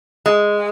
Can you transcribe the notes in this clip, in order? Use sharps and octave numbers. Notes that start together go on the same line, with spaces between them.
G#3